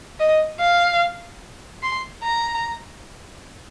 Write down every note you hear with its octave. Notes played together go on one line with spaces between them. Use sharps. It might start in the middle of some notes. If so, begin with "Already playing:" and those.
D#5
F5
C6
A#5